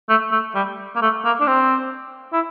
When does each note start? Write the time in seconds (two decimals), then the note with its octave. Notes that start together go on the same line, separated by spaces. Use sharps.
0.09 A3
0.31 A3
0.55 G3
0.95 A#3
1.01 A3
1.24 A#3
1.40 D4
1.47 C4
2.32 E4